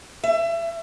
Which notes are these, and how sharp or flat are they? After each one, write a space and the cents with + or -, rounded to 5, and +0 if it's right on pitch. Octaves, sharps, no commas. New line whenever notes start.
E5 +30